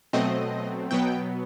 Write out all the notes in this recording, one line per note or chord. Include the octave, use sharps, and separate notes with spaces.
B2 F#3 A3 C4 D#5
B2 F#3 B3 G5